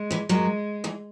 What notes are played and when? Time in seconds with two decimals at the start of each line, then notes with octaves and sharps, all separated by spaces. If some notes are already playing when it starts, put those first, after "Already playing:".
Already playing: G#3
0.11 E2 E3
0.29 F#2 F#3 G#3
0.84 E2 E3